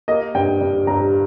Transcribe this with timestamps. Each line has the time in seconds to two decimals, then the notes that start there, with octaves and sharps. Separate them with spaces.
0.08 A#3 D#5
0.35 G2 G5
0.61 G2
0.87 G2 A#5